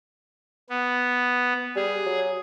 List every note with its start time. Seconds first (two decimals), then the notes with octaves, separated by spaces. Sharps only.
0.70 B3
1.76 G3 G#4
2.06 F#3